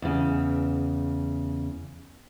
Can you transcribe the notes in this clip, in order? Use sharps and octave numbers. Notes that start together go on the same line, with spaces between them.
E2 C#3